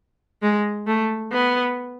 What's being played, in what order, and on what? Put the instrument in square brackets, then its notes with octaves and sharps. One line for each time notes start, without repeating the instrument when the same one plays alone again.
[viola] G#3
A3
B3